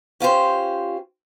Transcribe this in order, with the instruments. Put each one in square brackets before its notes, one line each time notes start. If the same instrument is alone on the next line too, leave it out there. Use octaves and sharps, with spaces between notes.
[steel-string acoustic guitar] C#4 F4 G4 C5